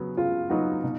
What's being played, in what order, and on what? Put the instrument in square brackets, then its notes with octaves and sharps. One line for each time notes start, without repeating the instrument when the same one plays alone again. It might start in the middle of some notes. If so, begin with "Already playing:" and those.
Already playing: [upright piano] C#3 F#3 B3 F#4
[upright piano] C#3 [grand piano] F4
[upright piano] F#3 B3 F#4 [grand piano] D#4
[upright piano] B2